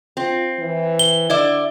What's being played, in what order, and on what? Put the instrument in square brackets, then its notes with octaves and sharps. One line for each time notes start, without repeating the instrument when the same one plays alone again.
[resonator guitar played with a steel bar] C4 [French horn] F4
[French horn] E3
[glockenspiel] G7
[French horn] D3 [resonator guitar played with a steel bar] E4 D5 E5